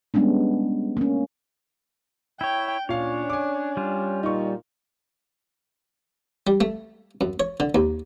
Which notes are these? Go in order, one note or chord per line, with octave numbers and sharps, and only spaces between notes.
G3 G#3 B3 C#4 D4
A#3 C#4
E4 C#5 G5
A#2 C#4 D4 C#5 F5
G#5 D6
G3 F4
A#2 D#4 C#6
G3
A3
F#2
C#5
D3
D#2